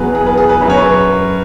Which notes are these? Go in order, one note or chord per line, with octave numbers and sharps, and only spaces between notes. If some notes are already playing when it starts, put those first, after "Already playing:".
Already playing: E2 B2 F#3 G#4 B4
G#4
B4
G#4
B4
F#2 F#3 B4
C#5
B4